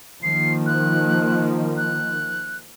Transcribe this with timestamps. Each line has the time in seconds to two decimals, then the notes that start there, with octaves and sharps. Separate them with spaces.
0.23 D#3 F3 A#3 C7
0.66 F#6
1.77 F#6